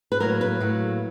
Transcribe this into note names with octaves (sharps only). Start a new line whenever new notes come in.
B4
A2 F#3 A#3 A#4
B4
A2 F#3 A#3